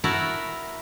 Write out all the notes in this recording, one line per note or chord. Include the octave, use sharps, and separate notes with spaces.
E4 F#4 A#4 F#5 A5